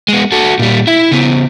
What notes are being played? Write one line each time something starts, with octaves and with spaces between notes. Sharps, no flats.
G#3 B3
F#4 A4
A#2 G3
E4 E5
C#3 B3